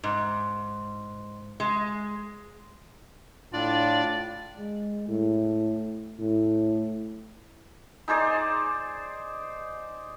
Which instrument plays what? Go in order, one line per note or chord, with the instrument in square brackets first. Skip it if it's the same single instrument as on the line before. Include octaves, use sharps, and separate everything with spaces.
[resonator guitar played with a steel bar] G#2
G#3
[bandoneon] A2 D4 F4 [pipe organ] D5
[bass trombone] G#3
A2
A2
[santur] D#4 G#4 C5 D5